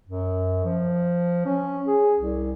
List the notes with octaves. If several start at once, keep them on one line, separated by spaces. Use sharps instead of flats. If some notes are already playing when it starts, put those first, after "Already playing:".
F#2
F3
C#4
G#4
C2